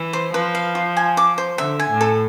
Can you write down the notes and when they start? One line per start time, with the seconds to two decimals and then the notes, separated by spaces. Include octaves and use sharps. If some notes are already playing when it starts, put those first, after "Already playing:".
Already playing: E3
0.13 C5
0.33 F3 B4
0.55 F5
0.75 F4
0.97 G#5
1.17 D6
1.38 C5
1.58 D3 E5
1.80 G#5
1.90 A2
2.01 A4